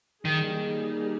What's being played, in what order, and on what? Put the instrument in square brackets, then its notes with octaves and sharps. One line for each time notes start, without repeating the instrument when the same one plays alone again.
[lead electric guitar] D#3 [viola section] G3 A#3 D#4 G#4